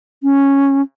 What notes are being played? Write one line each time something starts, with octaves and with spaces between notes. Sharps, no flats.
C#4